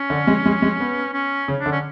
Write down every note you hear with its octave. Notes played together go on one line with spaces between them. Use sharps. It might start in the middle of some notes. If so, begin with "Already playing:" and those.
Already playing: C#4
D3
G#3
G#3
G#3
B3
C#4
C#3
D4
D3
C#4